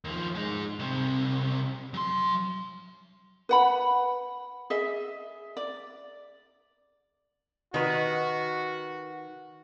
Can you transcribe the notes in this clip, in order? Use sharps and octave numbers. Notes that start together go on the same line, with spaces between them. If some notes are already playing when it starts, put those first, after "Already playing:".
D#2 F3
G#3 D#4
C2 C3
F#3 C6
B4 F#5 B5
G#4 D#5 E5
D5
D#3 F#4 B4